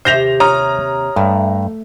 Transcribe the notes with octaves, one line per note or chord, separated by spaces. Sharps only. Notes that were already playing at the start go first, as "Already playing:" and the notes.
D#2 C3 G4 C5 E5 G6 A#6 F7
C#5 A#5 D#6 F6
G2 A3